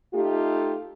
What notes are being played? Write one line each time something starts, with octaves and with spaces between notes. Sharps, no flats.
A3 D#4 F4 G4